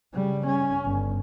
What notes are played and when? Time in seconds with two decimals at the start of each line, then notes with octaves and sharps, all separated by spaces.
0.14 C#3 G3
0.47 C#4
0.85 G1